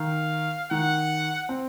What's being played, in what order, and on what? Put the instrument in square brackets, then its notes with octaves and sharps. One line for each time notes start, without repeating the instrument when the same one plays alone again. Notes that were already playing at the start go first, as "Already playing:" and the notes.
Already playing: [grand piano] D#3 [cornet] F5
[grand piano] D#3 [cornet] F#5
[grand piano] C4